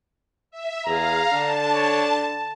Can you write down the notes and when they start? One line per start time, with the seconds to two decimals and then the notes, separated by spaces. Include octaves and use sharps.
0.51 E5
0.86 E2 G#4 F5 A#5
1.33 D3 D4 A5
1.74 C#5
2.22 A5